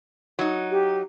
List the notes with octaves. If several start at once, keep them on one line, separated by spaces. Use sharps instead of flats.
F#3 D#4
G4